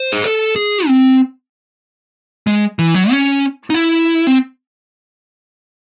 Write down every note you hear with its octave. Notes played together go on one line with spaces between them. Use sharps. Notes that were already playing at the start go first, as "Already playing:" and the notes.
Already playing: C5
G#4
A4
G#4
C4
G#3
E3
F#3
C#4
D#4
E4
C4